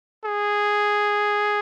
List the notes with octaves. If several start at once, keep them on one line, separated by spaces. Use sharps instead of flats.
G#4